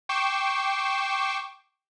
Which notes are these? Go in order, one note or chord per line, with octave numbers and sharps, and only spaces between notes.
G5 C#6 D6 C7 E7